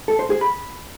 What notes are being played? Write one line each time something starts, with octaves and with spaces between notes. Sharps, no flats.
A4
C5
G#4
B5